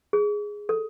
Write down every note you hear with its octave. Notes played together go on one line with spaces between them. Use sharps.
G#4
A4